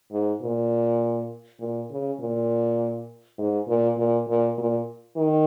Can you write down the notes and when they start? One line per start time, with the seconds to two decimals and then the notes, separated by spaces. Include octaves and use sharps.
0.12 G#2
0.42 A#2
1.60 A#2
1.90 C#3
2.20 A#2
3.38 G#2
3.68 A#2
3.98 A#2
4.28 A#2
4.58 A#2
5.17 D#3